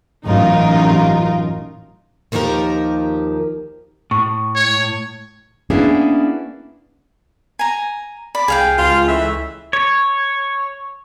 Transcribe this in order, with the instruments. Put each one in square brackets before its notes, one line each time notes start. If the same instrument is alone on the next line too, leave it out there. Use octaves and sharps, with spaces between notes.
[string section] A1 F#2 D#4 F4 A#4
[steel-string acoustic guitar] D#2 D#3 F3 G4 A#4
[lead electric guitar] A2 [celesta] C#6
[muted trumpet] C#5
[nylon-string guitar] A#3 B3 C#4 D4 E4 G#4
[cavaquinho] G#5 A#5
[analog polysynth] D5 [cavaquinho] B5
[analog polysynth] C2 [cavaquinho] G#4 F5 G5
[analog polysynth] C#2 [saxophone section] F4
[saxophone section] E3 A3 E5
[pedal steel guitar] C#5